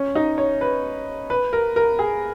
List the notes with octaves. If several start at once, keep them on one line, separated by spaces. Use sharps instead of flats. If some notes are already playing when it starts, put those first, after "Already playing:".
Already playing: C#4
D#4
C#5
B4
B4
A#4
A#4
G#4